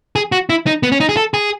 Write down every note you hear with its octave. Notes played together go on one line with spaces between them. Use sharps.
G#4
F#4
E4
D#4
B3
C#4
D#4
G#4
A4
G#4